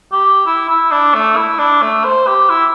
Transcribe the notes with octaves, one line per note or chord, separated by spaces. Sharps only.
G4
E4
E4
D4
A3
E4
D4
A3
C5
G4
E4